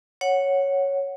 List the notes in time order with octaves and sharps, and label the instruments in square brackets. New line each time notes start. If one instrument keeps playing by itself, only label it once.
[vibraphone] C#5 F#5